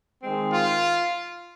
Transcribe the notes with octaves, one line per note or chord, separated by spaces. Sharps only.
D#3 G#3 C4
F4